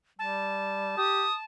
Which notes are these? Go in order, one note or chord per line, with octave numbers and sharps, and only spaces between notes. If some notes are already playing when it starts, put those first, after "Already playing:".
G3 A5
G4 D#6